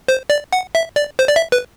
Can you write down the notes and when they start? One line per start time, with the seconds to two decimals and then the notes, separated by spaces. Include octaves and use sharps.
0.08 C5
0.30 D5
0.53 F#5
0.75 E5
0.96 D5
1.19 C5
1.28 D5
1.36 E5
1.52 B4